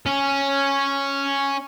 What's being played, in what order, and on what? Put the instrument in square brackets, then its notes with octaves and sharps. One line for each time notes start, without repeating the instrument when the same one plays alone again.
[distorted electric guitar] C#4